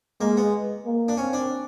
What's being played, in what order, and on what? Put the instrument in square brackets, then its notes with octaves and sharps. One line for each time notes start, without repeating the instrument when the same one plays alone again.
[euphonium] G#3 [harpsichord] A#3
[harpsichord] B3
[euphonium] A#3
[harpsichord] D4
[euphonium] C4 [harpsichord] C#4
[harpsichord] D4